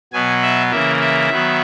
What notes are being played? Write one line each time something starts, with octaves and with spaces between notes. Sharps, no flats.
B2 F#3 B3 G#5
E5
C#3 E3 A#3 E5
E5
D#3 F#3 B3